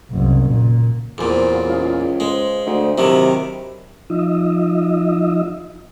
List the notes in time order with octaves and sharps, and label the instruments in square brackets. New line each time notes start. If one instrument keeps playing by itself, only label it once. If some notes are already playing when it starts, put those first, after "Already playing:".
[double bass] F#1 C2
A#2
[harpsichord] E2 A#2 [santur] C4 G#4 G#5
[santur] F#3 B4 F5
[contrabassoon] C#2 [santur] G#4 F5 A#5
[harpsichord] G#3 [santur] C5
[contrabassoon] D2 [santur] C5
[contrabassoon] C3 [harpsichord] D#3 F#3 [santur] D4 E4 D5
[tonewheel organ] F3 D#4 F4 D#5 E5